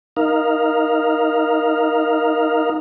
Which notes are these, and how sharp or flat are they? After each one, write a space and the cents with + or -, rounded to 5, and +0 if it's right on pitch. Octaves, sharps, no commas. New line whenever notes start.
D#4 +0 A#4 +5 F5 +0